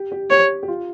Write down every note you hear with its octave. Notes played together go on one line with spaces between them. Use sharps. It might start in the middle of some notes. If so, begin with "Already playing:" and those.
Already playing: G4
G4
G4 C#5
G4
F4